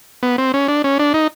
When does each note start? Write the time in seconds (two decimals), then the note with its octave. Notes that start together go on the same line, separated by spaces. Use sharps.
0.23 B3
0.38 C4
0.54 C#4
0.68 D4
0.84 C#4
0.99 D4
1.14 D#4